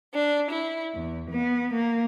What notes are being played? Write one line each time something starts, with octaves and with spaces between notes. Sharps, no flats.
D4
E4
E2
B3
A#3